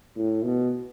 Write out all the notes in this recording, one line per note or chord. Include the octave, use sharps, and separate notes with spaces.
A2
B2